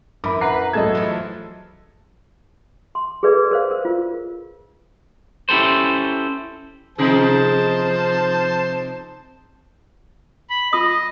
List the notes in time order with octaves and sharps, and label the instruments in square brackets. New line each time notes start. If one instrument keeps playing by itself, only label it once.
[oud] F#2 E3 [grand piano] B5 D6
[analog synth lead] B4 [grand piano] F#5 A#5 C7
[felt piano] F#3 A3 G#6 [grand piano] G#4 D#5 [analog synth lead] A4
[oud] E3 F3
[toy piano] C6
G#4 A4 B4 D5
A#4 C5 F5
A#4
F4
[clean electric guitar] C#4 E4 G4 A4 C5
[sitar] C3 D#4 G#4 [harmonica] F3 C5 A5
[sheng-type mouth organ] B5
[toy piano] F4 B5 D#6 [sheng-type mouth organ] D#5